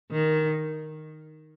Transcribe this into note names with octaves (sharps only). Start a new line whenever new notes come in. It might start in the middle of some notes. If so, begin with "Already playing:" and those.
D#3